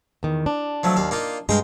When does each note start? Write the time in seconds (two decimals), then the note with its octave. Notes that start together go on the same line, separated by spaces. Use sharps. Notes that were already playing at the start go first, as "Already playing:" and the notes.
0.23 E2 D#3
0.46 D4
0.83 F3 F#3 A3
0.96 D#2 F5
1.11 A#3 D#4 F4
1.49 G2 G#3 F5 G5 A#5